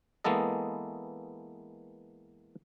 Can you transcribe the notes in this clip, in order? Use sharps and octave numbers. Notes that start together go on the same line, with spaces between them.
E3 G#3 A#3 B3 A4 D#5